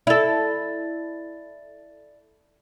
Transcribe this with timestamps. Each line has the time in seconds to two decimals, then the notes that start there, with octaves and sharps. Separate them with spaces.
0.07 E4 A4 D5 A6